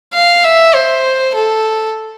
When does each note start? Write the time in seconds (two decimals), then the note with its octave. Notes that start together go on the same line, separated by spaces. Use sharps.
0.13 F5
0.43 E5
0.74 C5
1.34 A4